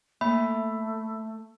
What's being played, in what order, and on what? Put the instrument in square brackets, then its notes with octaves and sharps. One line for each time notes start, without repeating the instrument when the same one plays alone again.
[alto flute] A3 [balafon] A#3 [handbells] E5 [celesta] B5